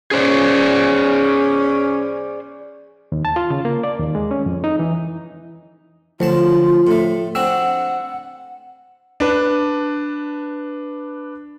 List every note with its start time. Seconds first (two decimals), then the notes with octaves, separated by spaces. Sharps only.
0.11 C#4 G#4 C5 D5
3.12 D#2
3.25 A5
3.36 F4
3.50 C#3
3.65 A#3
3.83 D5
3.99 D#2
4.15 G#3
4.31 C#4
4.46 F2
4.64 D#4
4.79 E3
6.20 D2 F3 F#3 F4 A5
6.87 A2 A3
7.35 C4 D4 F#4 F#5 E6
9.20 D4 B4